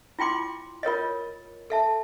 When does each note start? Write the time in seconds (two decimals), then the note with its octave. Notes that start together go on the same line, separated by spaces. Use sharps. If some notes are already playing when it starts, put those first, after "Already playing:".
0.19 E4 F4 G5 C6 D6
0.83 F4 A#4 C#5 D#5
1.70 A4 E5 A5